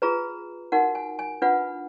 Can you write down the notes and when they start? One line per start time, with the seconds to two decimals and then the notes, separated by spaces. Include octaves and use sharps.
0.02 F4 G#4 B4 A#5
0.72 D#4 F#4 A#4 F#5
0.95 G#5
1.19 G#5
1.42 D4 F4 B4 F#5